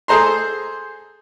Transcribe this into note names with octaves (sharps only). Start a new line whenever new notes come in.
G#4 A4 C5 A#5 C6